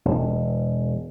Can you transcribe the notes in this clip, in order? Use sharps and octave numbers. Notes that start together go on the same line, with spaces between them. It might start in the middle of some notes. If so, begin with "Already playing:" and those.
E1